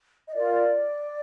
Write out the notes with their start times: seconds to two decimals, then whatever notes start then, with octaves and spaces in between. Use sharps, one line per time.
0.27 D#5
0.35 F4 A#4 D5